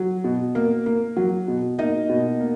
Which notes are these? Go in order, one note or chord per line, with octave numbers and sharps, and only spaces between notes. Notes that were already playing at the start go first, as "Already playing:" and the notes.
Already playing: F#3
B2
A#3
A#3
F#3
B2
A#3 D#4 D#5
B2
A#3